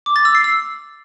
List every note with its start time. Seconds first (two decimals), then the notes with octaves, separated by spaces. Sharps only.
0.06 D6
0.16 A6
0.25 E6
0.35 C7
0.44 E6